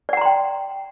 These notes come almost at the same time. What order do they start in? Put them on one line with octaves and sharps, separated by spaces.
D5 F#5 A#5 C6 G5